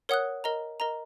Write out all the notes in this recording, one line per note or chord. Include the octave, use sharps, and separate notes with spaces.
A#4 C#5 F#5 D#6 F#6
A#4 D#5 A#5
A#4 D#5 A#5